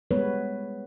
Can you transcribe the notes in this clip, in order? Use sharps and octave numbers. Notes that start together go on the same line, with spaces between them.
G3 G#3 B3 B4 C#5